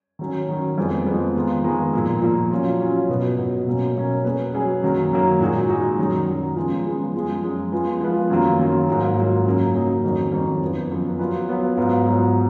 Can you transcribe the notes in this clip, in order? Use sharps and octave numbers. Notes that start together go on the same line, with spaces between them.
D#3 F#3 C#4
D#3 F#3 C#4
F2 F3 G#3 B3
F2 F3 G#3 B3
D#3 G#3 B3 F4
D#3 G#3 B3 F4
A#2 F3 A#3
A#2 F3 A#3
F#3 C#4 F4
F#3 C#4 F4
B2 F#3 B3
B2 F#3 B3
B2 F#3 A#3 C#4
B2 F#3 A#3 C#4
F#3 C#4 G#4 B4
F#3 C#4 G#4 B4
F#2 D#3 F#3 A#3
F#2 D#3 F#3 A#3
A#2 G#3 D#4 F#4
A#2 G#3 D#4 F#4
F#2 D#3 F#3
F#2 D#3 F#3
C#3 F3 G#3 B3 F4
C#3 F3 G#3 B3 F4
F#2 F3 G#3
F#2 F3 G#3
F3 G#3 B3 F4 B4
F3 G#3 B3 F4 B4
F#2 D#3 F#3 A#3 F4
F#2 D#3 F#3 A#3 F4
G#2 F#3 A#3 F4
G#2 F#3 A#3 F4
F#2 C#3 F#3 A#3 D#4
F#2 C#3 F#3 A#3 D#4
F2 D#3 F#3 C#4
F2 D#3 F#3 C#4
F#2 F3 B3
F#2 F3 B3
F#3 B3 F4 B4
F#3 B3 F4 B4
G#2 F#3 B3 F4
G#2 F#3 B3 F4